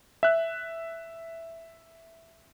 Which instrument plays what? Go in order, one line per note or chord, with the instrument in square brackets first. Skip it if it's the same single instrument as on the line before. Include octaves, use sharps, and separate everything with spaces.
[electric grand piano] E5 F#6